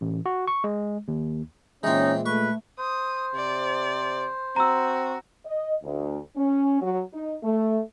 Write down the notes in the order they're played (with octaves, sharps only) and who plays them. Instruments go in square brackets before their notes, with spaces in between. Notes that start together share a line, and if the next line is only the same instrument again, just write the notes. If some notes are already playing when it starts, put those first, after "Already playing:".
[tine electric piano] A1
F#4
C#6
G#3
D#2
[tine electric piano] A#2 G#3 [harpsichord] E3 C4 [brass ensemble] C#4 [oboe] D#4
[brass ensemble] A3 [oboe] B4 [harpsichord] C#6
[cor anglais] C5 [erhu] D#6
[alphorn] C3 [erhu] D5
[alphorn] C4 [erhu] F#4 [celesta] A#5 E6
[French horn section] D#5
D2
C#4
F#3
D#4
A3